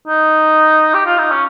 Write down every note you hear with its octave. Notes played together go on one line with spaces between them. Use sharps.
D#4
G4
F4
D#4
C#4